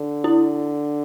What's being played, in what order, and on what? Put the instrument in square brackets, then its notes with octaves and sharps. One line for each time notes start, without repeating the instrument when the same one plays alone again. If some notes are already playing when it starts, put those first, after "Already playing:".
Already playing: [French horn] D3
[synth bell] E4